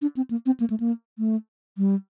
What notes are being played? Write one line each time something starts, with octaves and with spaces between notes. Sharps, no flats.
D4
C4
A#3
C4
A#3
A3
A#3
A3
G3